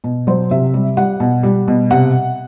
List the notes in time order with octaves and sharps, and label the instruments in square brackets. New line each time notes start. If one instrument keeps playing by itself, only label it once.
[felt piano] B2
F#3 C5
C3 E5
G3
G3 F#5
B2
G3
B2
C3 F#5